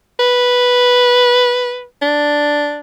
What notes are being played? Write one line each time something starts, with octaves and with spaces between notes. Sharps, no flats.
B4
D4